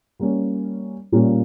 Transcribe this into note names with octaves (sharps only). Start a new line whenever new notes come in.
G3 A#3 C#4
A#2 G3 A#3 C#4